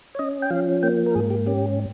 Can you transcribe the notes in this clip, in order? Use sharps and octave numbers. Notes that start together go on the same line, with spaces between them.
C#5
C#4 D#5
G5
F3 F5
A#3 G5
A#4
G#2 G#4
G4
C#4 G4